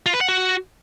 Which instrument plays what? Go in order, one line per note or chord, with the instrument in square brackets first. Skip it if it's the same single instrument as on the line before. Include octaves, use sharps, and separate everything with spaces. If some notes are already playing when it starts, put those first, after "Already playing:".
[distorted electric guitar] F4
B4
F#5
F#4